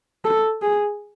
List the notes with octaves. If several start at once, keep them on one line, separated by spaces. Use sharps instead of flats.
A4
G#4